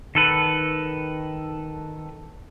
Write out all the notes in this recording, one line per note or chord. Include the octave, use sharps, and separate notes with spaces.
D#3 A4 B4